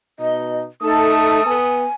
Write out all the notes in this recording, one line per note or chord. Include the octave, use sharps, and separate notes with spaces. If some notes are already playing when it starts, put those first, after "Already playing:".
B2 D#4 D#5
A3 D#4 A4 A5 D#6
B3 G#5